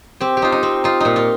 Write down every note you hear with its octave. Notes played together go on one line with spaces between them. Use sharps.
C4 G4
G4
D#4 F4
D#4
C4
D#4 F4
A#2 D#4
F4